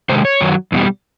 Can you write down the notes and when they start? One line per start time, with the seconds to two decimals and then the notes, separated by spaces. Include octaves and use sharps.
0.09 C3 D#3 G#3 C5
0.25 C#5
0.41 F#2 D#3 F#3
0.72 E2 B2 G3